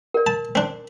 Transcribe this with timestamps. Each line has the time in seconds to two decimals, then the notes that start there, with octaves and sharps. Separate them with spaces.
0.14 A#4 D5
0.27 A5
0.55 C4 D4